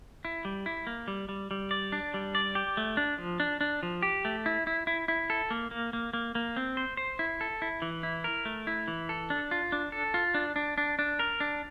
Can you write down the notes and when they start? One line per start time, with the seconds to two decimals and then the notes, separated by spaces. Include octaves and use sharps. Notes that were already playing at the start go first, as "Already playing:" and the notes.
0.25 E4
0.45 G3
0.66 E4
0.87 A#3
1.08 G3
1.29 G3
1.51 G3
1.71 D5
1.92 D4
2.14 G3
2.35 D5
2.55 G4
2.77 A3
2.97 D4
3.18 F3
3.40 D4
3.61 D4
3.83 F3
4.03 G4
4.25 A3
4.46 E4
4.67 E4
4.87 E4
5.08 E4
5.30 A4
5.50 A#3
5.71 A#3
5.93 A#3
6.13 A#3
6.35 A#3
6.56 C4
6.77 C5
6.97 C5
7.19 E4
7.41 A4
7.62 E4
7.82 E3
8.03 E4
8.24 A#4
8.45 A3
8.67 E4
8.88 E3
9.09 A4
9.30 D4
9.51 F4
9.72 D4
9.92 A4
10.14 F4
10.35 D4
10.56 D4
10.78 D4
10.99 D4
11.19 A#4
11.40 D4